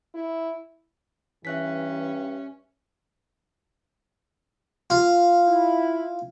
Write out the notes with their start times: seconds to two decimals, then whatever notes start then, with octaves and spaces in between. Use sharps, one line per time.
0.14 E4
1.45 G2 E3 C#4 E5 F#6 B6
4.90 F4
5.47 E4